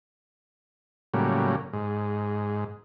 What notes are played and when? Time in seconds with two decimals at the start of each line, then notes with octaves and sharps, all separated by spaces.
1.14 A2 C#3 F#3 G3 A#3
1.73 G#2